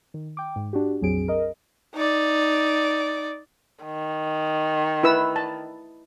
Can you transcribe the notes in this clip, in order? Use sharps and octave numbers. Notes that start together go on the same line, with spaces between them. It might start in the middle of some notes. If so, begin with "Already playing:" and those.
D#3
G5 D6
G#2
D4 F#4 G4
A#1 F2 F#3 C4 G#4 D7
A#4 D#5
D#4 D5
D#3
E4 B4 E6
A5